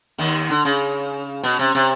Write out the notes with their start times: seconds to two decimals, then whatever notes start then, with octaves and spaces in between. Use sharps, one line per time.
0.18 D#2 D#3
0.50 D3
0.65 C#3
1.43 B2
1.59 C3
1.75 C3